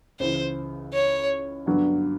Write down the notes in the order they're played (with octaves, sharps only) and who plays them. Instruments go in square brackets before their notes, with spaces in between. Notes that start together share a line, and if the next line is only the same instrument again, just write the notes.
[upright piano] C#2 C#3 E3 [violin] C5
[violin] C#5
[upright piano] G2 D3 F#3 B3 D4